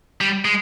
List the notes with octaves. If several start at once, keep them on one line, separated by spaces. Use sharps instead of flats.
G3
G#3